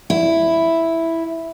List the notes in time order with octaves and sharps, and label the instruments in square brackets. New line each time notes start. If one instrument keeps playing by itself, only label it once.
[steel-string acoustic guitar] E4